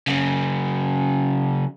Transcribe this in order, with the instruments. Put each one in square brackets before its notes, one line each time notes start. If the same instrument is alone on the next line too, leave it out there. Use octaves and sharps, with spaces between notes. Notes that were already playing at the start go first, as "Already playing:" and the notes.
[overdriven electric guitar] C#3 F#3